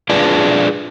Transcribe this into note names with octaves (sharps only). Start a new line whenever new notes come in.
D4 F4 G#4 B4 D5